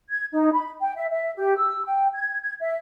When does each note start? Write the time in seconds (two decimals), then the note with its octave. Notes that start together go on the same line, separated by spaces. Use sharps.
0.10 G#6
0.32 D#4
0.53 B5
0.80 G5
0.96 E5
1.11 E5
1.37 G4
1.57 E6
1.85 G5
2.14 G#6
2.41 G#6
2.60 E5